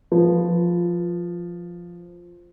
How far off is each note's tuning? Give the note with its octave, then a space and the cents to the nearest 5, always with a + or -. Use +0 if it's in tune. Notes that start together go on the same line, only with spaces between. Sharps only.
F3 +0 B4 +0